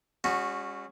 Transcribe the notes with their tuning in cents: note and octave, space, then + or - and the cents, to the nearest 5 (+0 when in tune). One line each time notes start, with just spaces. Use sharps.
G#3 -45 C#4 +0 F#4 -15